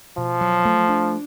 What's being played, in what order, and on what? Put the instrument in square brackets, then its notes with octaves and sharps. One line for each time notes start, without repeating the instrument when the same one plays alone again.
[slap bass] B2 [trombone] F3
[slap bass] F#3
A3
D4